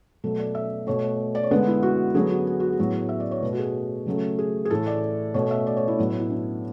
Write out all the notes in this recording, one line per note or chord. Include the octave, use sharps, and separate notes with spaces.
B2 F#3 A3 A4
D5
E5
B2 A3 C#5
D5
C#5
D3 G#3 B3 B4
E4
F#4
D3 F#3 B3 G#4
F#4
G#4
F#4
G#4
A2 F#3 B3
E5
D5
C#5
B2 A3 B4
F#4
G#4
C#3 F#3 A3
G#4
G#4
A2 E3 A3 A4
D5
B2 A3 C#5
E5
D5
C#5
E4
A2 F#3 B3
E4
D4